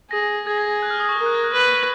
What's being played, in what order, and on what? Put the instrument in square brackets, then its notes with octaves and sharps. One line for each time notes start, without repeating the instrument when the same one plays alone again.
[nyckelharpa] G#4 [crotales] A#6
[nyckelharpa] G#4 [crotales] G#6
[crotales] A#6
F#6
F6
D#6
C#6
[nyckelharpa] A#4 [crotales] D#6
[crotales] F#6
G#6
F#6
[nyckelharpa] B4